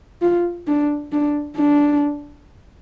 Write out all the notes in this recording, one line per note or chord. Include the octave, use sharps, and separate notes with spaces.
F4
D4
D4
D4